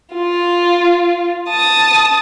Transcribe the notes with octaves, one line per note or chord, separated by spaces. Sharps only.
F4
A5 D#6